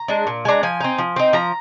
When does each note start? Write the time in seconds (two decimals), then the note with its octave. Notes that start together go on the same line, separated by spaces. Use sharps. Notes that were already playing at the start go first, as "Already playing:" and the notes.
Already playing: A#5
0.08 G#3 D4
0.27 A#2
0.45 G#3 D4 A#5
0.63 F3 G#5
0.81 C4 D#4
0.98 F3
1.16 C4 D#4
1.33 F3 A#5